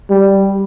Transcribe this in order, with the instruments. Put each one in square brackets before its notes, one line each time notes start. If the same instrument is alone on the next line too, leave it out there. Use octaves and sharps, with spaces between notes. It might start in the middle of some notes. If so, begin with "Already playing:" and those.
[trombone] G3